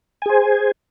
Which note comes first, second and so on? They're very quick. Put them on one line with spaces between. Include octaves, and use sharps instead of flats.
G#5 G#4 C5